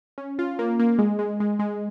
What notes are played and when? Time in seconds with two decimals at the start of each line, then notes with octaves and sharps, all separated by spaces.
0.18 C#4
0.39 F4
0.59 A#3
0.79 A#3
0.99 G#3
1.19 G#3
1.40 G#3
1.59 G#3